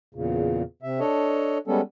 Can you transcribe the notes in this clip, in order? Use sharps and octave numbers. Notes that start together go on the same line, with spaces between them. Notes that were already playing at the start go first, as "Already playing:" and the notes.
E2 A#2 C#3
C3 E5
D4 A4 C#5 D#5
G3 G#3 B3 C#4 A4